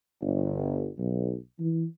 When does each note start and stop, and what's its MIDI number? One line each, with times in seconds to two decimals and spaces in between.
0.22 0.89 31
0.98 1.35 35
1.59 1.85 52